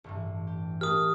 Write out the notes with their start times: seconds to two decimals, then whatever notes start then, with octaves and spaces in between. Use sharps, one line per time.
0.04 A1 G2 E3
0.47 G4
0.81 A3 D4 G4 A#4 D#6 F6